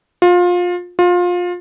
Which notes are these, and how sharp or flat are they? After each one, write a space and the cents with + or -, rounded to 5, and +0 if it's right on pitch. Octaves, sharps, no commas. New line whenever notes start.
F4 +25
F4 +25